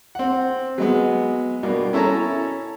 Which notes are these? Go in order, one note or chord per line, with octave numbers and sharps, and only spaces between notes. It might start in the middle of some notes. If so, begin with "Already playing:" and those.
C4 F#5
F#3 G#3 B3
G2 B2 A#3
C#4 E4 A4 C#5 A5 A#5